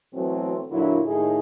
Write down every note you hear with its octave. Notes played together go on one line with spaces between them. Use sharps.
B2 E3 F#3 A3 C4
A#2 D3 F#3 D4 E4
D#2 A2 A3 D#4 G#4 D#5